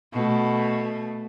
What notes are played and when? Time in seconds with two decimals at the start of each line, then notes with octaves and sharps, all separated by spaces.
0.12 B2 A3